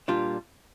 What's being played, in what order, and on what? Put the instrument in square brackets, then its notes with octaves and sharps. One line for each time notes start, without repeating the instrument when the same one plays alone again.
[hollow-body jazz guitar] A#2 G3 D4 F4